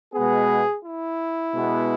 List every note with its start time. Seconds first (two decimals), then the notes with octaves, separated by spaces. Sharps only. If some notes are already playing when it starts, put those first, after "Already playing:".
0.14 B2 G#3 B3 G#4
0.83 E4
1.53 B2 G#3 B3